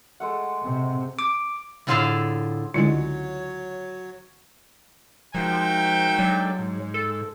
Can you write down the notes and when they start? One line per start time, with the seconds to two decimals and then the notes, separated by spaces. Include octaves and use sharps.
0.20 G#3 A3 F#5
0.62 C3
1.19 D6
1.87 A2 D3 F4 G#4 A4 F5
2.74 C#2 D3 F#3 G#3 E4 F4 C#5
5.35 F3 G#3 D#4 F#4 A#4 E5 G5
6.19 F#3 G#3 D4 A4
6.59 G#2
6.94 A4